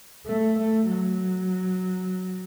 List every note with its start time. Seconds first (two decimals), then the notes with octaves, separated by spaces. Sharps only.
0.26 A3
0.59 A3
0.90 F#3